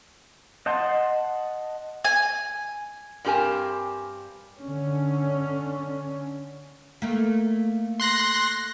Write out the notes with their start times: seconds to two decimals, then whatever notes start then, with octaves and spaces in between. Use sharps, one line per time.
0.66 D#5 F#5 A5 C6
2.04 G#5
3.25 G2 C4 G4 A#4 G#5 A5
4.62 D3 C#4
7.02 A3 A#3
8.00 C6 F#6 A#6